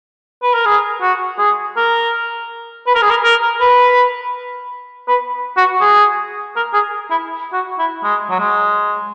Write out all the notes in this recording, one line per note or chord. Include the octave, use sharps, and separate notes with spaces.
B4
A#4
G#4
F#4
G#4
A#4
B4
A#4
G#4
A#4
A#4
B4
B4
F#4
G#4
A#4
G#4
E4
F#4
E4
G#3
F#3
G#3